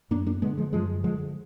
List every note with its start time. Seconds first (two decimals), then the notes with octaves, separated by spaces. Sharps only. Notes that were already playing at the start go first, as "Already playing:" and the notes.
0.11 F#2 A#3 D4
0.26 A#3 D4
0.42 D3 G#3 B3
0.57 F3 G#3
0.73 F#2 F3 G#3
1.04 D3 F3 G#3